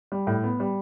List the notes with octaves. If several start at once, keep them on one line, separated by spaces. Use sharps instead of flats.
G3
A2
B3
G3